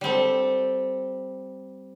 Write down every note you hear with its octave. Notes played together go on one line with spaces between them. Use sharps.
G3 C4 A4